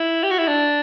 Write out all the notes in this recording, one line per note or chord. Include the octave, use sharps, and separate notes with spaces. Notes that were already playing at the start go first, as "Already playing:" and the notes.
Already playing: E4
G4
F#4
E4
D4